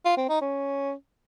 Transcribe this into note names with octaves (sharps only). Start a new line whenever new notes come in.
F4
C4
D#4
C#4